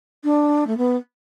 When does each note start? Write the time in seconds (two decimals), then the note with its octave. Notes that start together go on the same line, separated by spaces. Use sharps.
0.24 D4
0.67 A3
0.77 B3